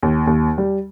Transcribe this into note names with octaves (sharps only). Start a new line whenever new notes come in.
D#2
D#2
G3